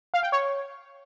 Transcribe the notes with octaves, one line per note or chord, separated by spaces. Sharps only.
F5
G5
C#5